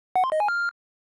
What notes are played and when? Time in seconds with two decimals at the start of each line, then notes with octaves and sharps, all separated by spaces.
0.16 F#5
0.24 C6
0.32 D#5
0.40 G#5
0.48 F6